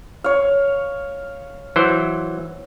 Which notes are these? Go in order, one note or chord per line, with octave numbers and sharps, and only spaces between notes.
C#5 F5
E3 F#3 C5